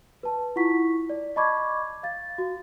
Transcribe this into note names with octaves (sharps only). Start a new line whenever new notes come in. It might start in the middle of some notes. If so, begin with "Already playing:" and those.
B4 A5
E4 F4 F#5 C#6 B6
D5
D#5 A5 B5 C#6 D6 G#6
F5 A6
F#4